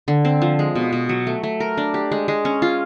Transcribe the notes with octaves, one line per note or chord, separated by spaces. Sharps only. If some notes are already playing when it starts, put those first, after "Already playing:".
D3
C4
F3
G#3
B2
B2
F#3
A3
A3
A#4
D4
G4
G#3
G#3
C#4
F4